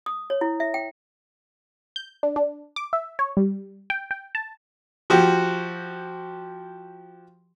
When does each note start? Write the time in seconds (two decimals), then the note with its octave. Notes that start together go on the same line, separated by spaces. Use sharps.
0.06 D#6
0.30 C#5
0.41 E4
0.60 E5
0.74 G5
1.96 G6
2.23 D4
2.36 D4
2.76 D6
2.93 E5
3.19 C#5
3.37 G3
3.90 G5
4.11 G5
4.35 A5
5.10 F3 F#4 G4